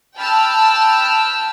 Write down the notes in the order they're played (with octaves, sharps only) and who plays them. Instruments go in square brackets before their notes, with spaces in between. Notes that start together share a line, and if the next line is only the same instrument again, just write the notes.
[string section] G5 A5 B5 E6 F6